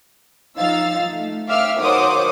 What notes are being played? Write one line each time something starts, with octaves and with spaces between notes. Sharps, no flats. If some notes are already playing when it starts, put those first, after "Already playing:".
F3 D#4 F5 E6 A6
A3
E5 F5 G5 D6 E6 F6
D#3 F#3 C5 F#5 D6 D#6